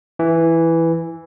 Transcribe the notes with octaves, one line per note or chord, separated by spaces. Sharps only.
E3